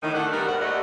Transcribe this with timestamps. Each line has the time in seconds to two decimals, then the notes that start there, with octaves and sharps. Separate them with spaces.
0.02 A2 D#3
0.14 A3 D4 A4 F#5
0.32 G3 B3 F#4 A#4
0.47 D#2 G#2 C#5 F#5
0.61 D#2 A3 F#4 D5 D#5